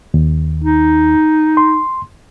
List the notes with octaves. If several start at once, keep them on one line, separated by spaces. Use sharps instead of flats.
D#2
D#4
C6